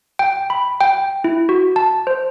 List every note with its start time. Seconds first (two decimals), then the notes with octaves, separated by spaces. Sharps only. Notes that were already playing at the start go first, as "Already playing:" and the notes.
0.19 G5
0.50 B5
0.81 G5
1.24 E4
1.49 F#4
1.76 A5
2.07 C5